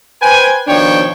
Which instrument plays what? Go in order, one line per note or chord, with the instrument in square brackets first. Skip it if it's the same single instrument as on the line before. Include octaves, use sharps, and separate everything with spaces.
[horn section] B4 C5 G5 G#5
B2 D#3 F3 D4 C#5 G5